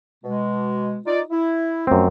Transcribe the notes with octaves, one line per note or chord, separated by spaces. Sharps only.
B2 G#3
D#4 F4 D5
E4
F#2 F3 A3 C4